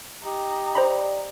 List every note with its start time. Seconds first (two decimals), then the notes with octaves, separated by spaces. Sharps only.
0.24 D#4 G4
0.75 C5 D5 A#5 B5